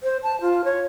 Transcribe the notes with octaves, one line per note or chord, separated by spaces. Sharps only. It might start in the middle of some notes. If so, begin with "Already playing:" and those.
C5
A5
F4
C#5